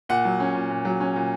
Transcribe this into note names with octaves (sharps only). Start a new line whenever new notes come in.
A#2 F#5
F#3
C#4
A#2
A#2
F#3
C#4
A#2